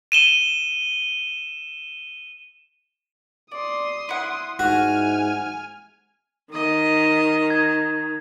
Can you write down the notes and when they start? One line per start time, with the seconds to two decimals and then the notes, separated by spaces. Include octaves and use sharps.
0.12 D#7 E7 G7
3.51 D5 C6 D#6
4.09 E4 F#5
4.59 G#2 F#4 G#5 F6
6.53 D#3 D#5
7.50 G#6